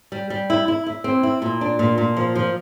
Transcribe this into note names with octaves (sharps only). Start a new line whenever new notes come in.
G3
G3
E4
E4
E4
C4
E4
A#2
D4
A#2
A#2
F3
F3